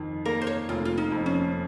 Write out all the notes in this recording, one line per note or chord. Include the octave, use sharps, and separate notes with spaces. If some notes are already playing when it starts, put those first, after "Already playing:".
Already playing: F2 D#3
A#3 A#4
C5
C#5
F1 F4
F4
D#4
F2
C#4